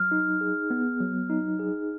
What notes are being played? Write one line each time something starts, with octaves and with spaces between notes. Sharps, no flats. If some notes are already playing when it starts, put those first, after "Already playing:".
Already playing: F#3 F6
D#4
G#4
B3
F#3
D#4
G#4